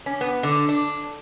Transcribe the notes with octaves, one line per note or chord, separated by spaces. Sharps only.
C#4
B3
D3
D4